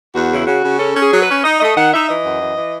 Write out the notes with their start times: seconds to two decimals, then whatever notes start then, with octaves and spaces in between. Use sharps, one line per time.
0.14 E2 F#4
0.30 C#3 E4
0.47 C#3 F#4
0.63 C#3
0.79 C#4 A4
0.95 C#4
1.01 G#4
1.12 F#3
1.22 B4
1.29 C#4
1.44 D#4 D#5
1.60 A3 D#5
1.77 D#3 F#5
1.93 D#4 E5
2.09 E3 D#5
2.25 F#2
2.42 E3
2.57 E3